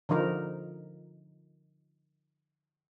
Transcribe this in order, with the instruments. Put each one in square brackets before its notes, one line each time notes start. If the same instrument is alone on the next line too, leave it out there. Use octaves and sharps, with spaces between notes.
[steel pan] D3 F3 D#4 A#4